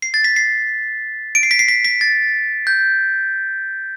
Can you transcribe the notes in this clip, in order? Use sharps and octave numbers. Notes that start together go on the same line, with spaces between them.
C7
A6
B6
C7
D7
C7
B6
C7
B6
B6
A6
G6